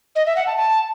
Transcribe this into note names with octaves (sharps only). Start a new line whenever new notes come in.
D#5
E5
F#5
A5
A5